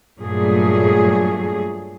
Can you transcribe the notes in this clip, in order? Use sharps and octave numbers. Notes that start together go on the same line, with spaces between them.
G2 A#2 F#3 A3 G#4